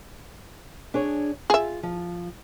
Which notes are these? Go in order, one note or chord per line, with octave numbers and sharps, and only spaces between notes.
D4 G#4 C#5
F4 G#4 E5
F3